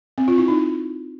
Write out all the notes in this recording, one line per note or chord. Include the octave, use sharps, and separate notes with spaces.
C4
F4
E4
D#4